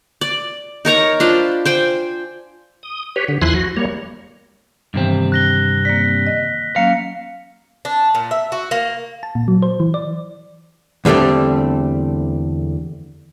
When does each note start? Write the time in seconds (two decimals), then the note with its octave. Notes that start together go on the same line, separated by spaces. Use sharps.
0.21 D5
0.85 D#4 A#4 C#5 A#5
1.20 D4 F4 C5 B5
1.65 C5 G5 G#5
2.83 D#6
3.16 G4 B4 C#5
3.28 D3
3.42 E2 F3 E4 G#5 C6 F#6
3.54 F#4
3.77 G3 A#3 C#5
4.94 G2 C3 D#3 E3 B3 C4
5.32 F#6 A#6 G7
5.85 A#3 D5 B6
6.26 D#5
6.76 F#3 A#3 C#4 F5 C#7
7.85 D4
8.15 A#2
8.31 E5
8.52 F#4
8.71 A#3
9.23 A5
9.35 A#2
9.48 F#3
9.62 C5
9.80 E3
9.94 D5
11.05 E2 D3 G3 A3 C4